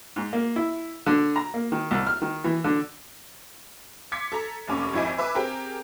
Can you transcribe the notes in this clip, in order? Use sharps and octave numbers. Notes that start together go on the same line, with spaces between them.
G#2
A#3
E4
D3
A#5
A#3
D#3
C2
F6
D#3
E3
D3
C6 D6 G#6 B6 C#7
A4 A#5
F1 D#2 C#4 D6
G#1 F2 E4 D#5 G#5
B4 E5 G#5 D6
C4 G4 G#4 A#4